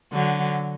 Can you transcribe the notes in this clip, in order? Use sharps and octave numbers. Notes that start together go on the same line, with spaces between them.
D3 F#3